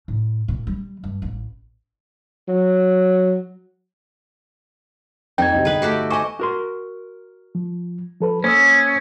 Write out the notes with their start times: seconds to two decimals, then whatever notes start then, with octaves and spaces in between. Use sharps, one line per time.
0.08 A2
0.48 A#2
0.67 G3
1.04 G2
1.22 A1
2.48 F#3
5.38 F2 D#4 G5 G#6
5.52 B1 C3
5.65 G1 G#4 B4
5.82 A3 F#4 G4
6.10 C5 D#5 G#5 C#6 D6
6.40 F#4 A#4 C6
7.55 F3
8.20 F3 A4 B4
8.44 A#3 C#4 C5 D#6 E6